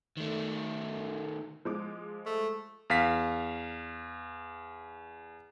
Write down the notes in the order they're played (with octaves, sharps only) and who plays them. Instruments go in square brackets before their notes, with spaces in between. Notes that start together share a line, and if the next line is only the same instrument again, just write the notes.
[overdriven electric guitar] D#3 A3
[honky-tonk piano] F3 G#3 D6
[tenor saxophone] A3
[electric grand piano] E2 F5 B6